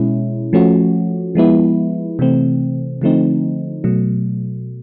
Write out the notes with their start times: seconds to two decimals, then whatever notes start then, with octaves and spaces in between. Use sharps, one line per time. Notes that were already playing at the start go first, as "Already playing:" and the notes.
Already playing: B2 G#3 C#4 E4
0.53 F3 A3 C#4 F#4
1.35 F3 G#3 B3 E4
2.19 C3 E3 A3 C4
3.02 D3 F3 A3 C4 D#4
3.84 B2 F#3 A3